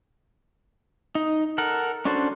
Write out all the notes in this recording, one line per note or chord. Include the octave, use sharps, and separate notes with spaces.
D#4
A4 A#4 F#5
C#4 D4 F#4 A4 C5